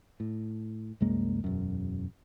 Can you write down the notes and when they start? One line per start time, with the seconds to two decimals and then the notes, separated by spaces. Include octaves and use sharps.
0.20 A2
1.01 C2 F#2 G#3 A#3
1.44 E1 F#2